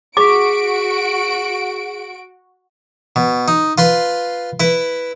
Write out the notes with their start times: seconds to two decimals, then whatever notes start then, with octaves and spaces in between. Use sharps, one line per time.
0.17 F#4 G#4 C#6 D6 B6 D7
3.16 B2
3.48 D#4
3.78 F4 B4 C6
4.60 E4 B4